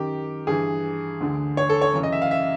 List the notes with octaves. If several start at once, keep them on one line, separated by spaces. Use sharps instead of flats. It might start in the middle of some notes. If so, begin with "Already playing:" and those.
Already playing: F#2 D#3 G4
G2 E3 G#4
D2 D3
C#5
A4
C#5
F#2 C#3 E3
D#5
E5
F5
E5